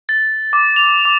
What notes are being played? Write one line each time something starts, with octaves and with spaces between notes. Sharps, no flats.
A6
D6
F7
D6